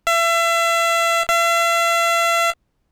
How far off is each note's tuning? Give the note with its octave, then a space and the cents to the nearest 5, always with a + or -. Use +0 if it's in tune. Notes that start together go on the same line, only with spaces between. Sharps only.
E5 +35
E5 +45